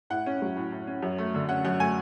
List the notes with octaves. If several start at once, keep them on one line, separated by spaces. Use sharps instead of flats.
A2 F#5
C#4
F#3
A2
A2
C#4
F#2
A3
D3
C#4 F#5
F#2 F#5
A3 G#5